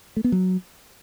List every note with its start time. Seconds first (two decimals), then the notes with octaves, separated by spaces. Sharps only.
0.17 A3
0.24 B3
0.32 F#3